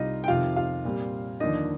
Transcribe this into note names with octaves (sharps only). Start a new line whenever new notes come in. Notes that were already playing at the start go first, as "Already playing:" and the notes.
Already playing: C2 C3 G3 D#4 F4 D#5
G5
F2 C3 D#3 F4 F5
F4 F5
A#2 G3 C4
D#2 D3 F3 A#3 D4 D#4 D#5